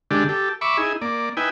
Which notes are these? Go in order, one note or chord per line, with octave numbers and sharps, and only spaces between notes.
D3 G#3 D4 G4 A4
G4 A4
E5 B5 C#6 D6
D#4 E4 G#4
A#3 D5
D#4 E4 B4 G5 G#5